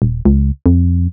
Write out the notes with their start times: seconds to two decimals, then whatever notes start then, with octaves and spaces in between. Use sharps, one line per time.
0.02 D#1
0.25 C#2
0.66 F2